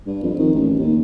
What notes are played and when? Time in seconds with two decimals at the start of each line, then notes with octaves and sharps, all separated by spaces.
0.06 G2
0.23 F2
0.39 D#3
0.55 A1
0.79 D#2